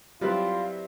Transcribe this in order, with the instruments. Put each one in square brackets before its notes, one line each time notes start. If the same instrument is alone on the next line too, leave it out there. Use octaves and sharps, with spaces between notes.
[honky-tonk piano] F#3 G3 C4 [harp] E4 B4 D5 [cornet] F4 [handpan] G4